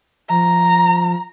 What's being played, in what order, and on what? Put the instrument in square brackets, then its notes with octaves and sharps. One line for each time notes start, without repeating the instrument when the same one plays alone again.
[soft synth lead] F3 [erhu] A#5